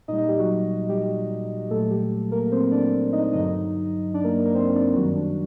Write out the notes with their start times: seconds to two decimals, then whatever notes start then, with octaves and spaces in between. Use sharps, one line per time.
0.08 A#2 G3 D#4 D#5
0.18 D#4 D#5
0.28 G3 G4
0.39 F#3 F#4
0.89 G3 G4
1.70 A#2 F#3 A3 A4
1.91 G3 G4
2.32 A#3 A#4
2.52 C4 C5
2.72 D4 D5
3.12 D#4 D#5
3.33 G2 D3 F#3 D#4 D#5
4.14 D4 D5
4.24 A#3 A#4
4.45 A#3 A#4
4.54 C4 C5
4.75 D4 D5
4.95 F#2 D#3 F#3 G3 F#4
5.16 D4